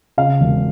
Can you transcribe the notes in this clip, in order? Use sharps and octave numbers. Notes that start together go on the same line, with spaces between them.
C#3 F5
E1